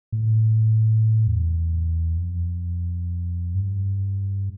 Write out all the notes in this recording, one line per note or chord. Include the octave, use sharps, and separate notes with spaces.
A2
E2
F2
G2